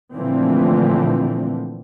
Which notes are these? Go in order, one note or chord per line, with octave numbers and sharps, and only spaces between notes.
A#2 D3 E3 F3 A3 C4